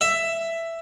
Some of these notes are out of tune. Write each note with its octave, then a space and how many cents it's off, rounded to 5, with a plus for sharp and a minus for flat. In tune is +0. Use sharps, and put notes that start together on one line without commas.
E5 +10